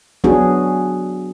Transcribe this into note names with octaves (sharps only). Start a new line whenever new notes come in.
F#3 B3 D4 F#4 G#4